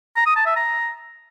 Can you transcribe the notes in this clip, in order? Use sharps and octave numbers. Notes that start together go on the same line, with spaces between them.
A#5
D#6
A5
E5
A#5